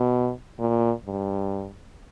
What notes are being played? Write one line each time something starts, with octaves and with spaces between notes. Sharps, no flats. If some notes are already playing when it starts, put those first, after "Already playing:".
Already playing: B2
A#2
G2